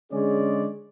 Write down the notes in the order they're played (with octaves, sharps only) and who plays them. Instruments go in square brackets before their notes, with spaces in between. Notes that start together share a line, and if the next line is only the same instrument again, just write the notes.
[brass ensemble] D3 G#3 C#4 G#4 C#5 D5